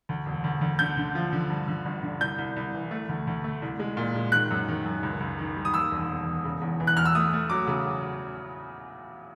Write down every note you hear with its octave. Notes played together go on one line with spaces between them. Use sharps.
D2
E1
D2
D2
D3 G6
D3
F3
D3
G2
D3
G1
D3
C2 G6
C2
C2
E3
A3
D2
D2
A3
C2
G#3
A#2
G#3
D#3 F#6
F#2
D#3
F#2
C#2
C#2
D#3
G3
D#6
D#2 E6
E1
E1
E1
C#3
E2
E3
F#6
E2 F6
E6
A3 D#6
A3
F#3 D6
C#3